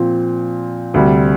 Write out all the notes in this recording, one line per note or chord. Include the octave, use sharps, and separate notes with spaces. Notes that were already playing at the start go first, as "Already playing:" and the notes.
Already playing: A#2 F3 C4
D2 C3 G3